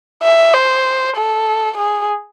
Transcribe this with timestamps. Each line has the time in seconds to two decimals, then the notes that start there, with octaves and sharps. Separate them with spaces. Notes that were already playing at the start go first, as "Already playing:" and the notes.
0.23 E5
0.54 C5
1.16 A4
1.78 G#4